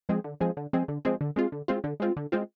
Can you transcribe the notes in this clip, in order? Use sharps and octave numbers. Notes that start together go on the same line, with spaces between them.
F3 G#3 C4 G#4
D3
F3 G#3 C4 G#4
D3
F3 G#3 C4 G#4
D3
F3 G#3 C4 G#4
D3
G#3 C4 F4
D3
G#3 C4 F4
D3
G#3 C4 F4
D3
G#3 C4 F4